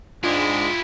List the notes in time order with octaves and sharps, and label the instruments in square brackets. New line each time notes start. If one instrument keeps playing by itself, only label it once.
[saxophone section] G#2 D4 [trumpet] G#3 [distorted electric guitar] E4 G4 [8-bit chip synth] F4